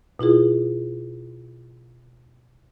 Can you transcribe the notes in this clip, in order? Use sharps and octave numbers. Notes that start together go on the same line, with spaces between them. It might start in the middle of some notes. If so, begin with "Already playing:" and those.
B2 E4 F4 G#4